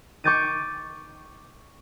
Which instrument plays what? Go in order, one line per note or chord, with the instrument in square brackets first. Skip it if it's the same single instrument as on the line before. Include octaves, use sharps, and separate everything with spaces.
[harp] C#6 D6 G6 A6 D7 D#7